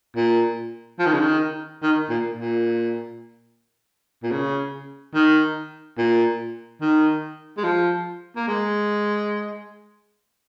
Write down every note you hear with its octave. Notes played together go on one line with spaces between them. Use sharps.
A#2
F3
D#3
C#3
D#3
D#3
A#2
A#2
A#2
C#3
D#3
A#2
D#3
G#3
F3
A#3
G#3